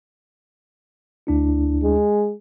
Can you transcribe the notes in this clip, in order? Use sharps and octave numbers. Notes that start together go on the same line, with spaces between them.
D2 D4 E4
G#3